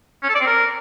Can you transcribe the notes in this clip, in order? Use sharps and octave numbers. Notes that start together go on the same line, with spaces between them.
C#4
A4
D5
C4
A#4